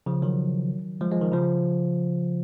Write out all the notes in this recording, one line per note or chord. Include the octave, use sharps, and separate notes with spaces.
C#3 F3
D#3 F#3
F3 G#3
F3 G#3
D#3
C#3 F3